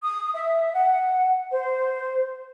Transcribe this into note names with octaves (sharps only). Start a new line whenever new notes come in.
D#6
E5
F#5
C5